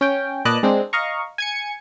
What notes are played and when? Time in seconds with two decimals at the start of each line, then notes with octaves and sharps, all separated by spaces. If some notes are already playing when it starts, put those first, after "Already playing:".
0.01 C#4 G5
0.45 A#2 B4 D5 D#5 A5 F#6
0.63 G#3 C4 D4
0.93 D#5 F5 A#5 C#6
1.38 G#5 G#6 C#7